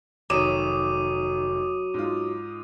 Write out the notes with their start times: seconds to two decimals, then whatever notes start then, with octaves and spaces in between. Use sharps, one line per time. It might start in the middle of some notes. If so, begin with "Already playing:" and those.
0.30 F1 D#3 F#3 D6 D#6 D#7 E7
1.94 G#2 F4